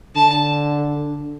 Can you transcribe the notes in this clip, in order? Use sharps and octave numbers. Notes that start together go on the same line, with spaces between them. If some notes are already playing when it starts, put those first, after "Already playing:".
D3 A5